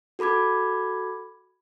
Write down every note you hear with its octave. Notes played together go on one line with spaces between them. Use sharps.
F#4 A4 B5 D6 G#6